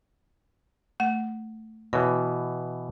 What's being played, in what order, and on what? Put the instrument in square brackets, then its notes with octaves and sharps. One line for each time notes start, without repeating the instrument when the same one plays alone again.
[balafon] A3 F#5
[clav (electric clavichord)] B2 E3 [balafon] C#5